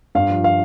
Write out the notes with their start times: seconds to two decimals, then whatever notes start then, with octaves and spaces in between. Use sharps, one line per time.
0.15 G2 F5
0.30 F3
0.44 F5